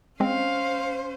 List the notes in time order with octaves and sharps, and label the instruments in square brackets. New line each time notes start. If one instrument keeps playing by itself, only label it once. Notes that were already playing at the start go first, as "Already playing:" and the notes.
[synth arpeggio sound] G#3 C4 [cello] C#4 C5 [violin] F5